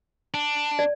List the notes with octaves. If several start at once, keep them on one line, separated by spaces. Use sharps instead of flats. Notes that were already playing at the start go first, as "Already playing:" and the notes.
D4
D5